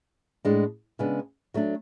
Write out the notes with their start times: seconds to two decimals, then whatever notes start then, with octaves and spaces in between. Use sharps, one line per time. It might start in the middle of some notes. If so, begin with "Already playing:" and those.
0.45 A2 G#3 D4
0.99 C#3 G#3 B3 D4
1.54 F#3 A3 D4